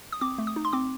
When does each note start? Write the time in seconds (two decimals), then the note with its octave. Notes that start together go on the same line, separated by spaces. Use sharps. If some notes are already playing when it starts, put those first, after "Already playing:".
0.12 D#6
0.21 C4 D6
0.38 A3
0.47 D#6
0.56 D#4
0.65 C6
0.73 C4 D6